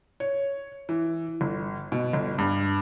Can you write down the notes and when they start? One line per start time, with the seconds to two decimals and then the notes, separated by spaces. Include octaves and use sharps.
0.20 C#5
0.89 E3
1.41 G1
1.92 B2
2.13 G1
2.38 G2